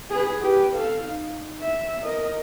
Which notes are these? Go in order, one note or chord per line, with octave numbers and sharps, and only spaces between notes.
G#4 B4
G4 B4
A4 F5
D#4
E5
A#4 D#5